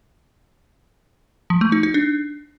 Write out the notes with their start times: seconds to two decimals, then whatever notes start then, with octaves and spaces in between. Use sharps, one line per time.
1.50 F3
1.61 A3
1.72 D#4
1.83 D#4
1.94 D4